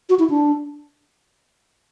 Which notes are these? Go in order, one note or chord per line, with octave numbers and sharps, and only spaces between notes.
F#4
E4
D4